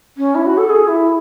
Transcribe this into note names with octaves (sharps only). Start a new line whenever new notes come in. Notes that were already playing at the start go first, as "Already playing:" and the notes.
C#4
E4
F#4
A4
G#4
E4